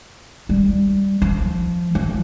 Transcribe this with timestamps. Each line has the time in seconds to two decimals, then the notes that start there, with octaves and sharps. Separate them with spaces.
0.49 G3
1.22 F3
1.95 F3